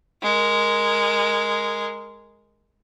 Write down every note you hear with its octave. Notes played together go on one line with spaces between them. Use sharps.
G#3 A#4